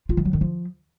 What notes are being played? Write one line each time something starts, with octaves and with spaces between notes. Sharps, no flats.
F4
E3
F#3
D#3
F3